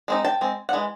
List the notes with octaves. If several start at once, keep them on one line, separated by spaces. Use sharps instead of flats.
G#3 C4 D#4
G5 A5
G#3 C4
F#5
E3 G#3